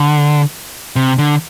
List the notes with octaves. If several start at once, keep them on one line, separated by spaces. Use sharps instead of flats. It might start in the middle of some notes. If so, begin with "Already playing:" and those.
Already playing: D3
C3
D3